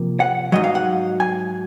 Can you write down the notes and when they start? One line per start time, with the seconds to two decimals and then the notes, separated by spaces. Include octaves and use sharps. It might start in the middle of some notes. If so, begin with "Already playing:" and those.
Already playing: C3 F3 A#3
0.20 F#5
0.52 G#2 D#3 F#3 D#5
0.64 F5
0.75 F#5
1.20 G#5